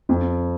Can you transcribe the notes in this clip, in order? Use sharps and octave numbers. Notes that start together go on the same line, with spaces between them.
F2